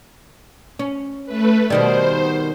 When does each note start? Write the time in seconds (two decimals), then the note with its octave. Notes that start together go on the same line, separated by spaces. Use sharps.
0.79 C#4
1.26 A3 B4
1.70 B2 D#3 G3 C5